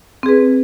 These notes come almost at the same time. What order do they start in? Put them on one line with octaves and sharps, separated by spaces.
C4 G#4 B4